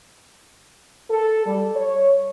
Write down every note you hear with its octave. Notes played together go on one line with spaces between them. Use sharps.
A4
G3
C#5